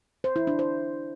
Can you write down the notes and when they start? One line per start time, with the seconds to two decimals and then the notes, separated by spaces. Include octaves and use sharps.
0.24 C5
0.36 E4
0.47 D4
0.59 C5